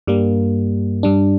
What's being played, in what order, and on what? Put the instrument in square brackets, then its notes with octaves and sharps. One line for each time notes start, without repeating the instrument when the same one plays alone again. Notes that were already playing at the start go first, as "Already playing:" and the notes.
[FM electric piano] G2 G3 A#3
G2 G3 D4